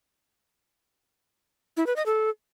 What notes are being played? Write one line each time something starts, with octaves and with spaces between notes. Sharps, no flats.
E4
B4
D#5
A4